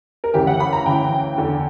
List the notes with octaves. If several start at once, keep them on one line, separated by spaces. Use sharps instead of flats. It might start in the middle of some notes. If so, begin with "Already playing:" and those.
A#4
D2 C#3 E3 G4
F#5
B5
A#5
D2 C#3 E3 G5
E2 D3